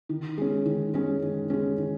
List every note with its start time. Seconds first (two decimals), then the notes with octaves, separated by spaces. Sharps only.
0.09 D#3
0.38 G#3 C#4
0.65 D#3
0.94 G#3 C#4
1.22 D#3
1.50 G#3 C#4
1.78 D#3